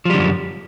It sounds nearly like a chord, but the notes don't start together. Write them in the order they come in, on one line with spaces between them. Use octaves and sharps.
F3 G3 D3 F#2